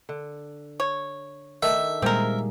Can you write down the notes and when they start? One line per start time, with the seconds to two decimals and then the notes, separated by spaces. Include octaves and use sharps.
0.09 D3
0.80 C#5
1.63 D#3 A3 D4 E5
2.02 A#2 G3 G#3 A#3 C4 G#4 A#4